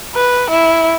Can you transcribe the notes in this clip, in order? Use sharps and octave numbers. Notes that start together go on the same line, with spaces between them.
B4
E4